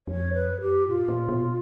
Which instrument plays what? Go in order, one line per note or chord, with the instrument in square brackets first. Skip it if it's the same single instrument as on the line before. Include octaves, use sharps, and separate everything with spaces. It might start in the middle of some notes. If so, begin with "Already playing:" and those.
[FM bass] F2 [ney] C#5
[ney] B4
[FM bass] F#2
[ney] G4
[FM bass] A#2 [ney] F4
[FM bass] A#2
B2